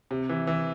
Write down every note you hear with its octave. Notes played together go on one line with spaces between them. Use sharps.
C3
E3
E3